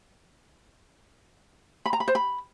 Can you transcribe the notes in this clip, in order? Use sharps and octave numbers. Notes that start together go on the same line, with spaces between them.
B5
A#5
B5
C5
B5